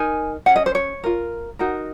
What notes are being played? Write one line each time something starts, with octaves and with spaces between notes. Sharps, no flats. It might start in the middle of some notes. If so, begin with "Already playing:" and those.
Already playing: D#4 A#4 G#5
C#4 G#4 F#5
D#5
C5
C#5
F4 A#4
D#4 F#4 A#4